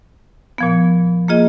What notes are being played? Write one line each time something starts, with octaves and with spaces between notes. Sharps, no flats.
A#2 F3 B3
A#3 F4 G#4 D#5